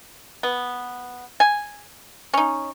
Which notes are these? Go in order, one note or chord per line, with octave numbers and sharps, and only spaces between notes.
B3
G#5
C#4 D#4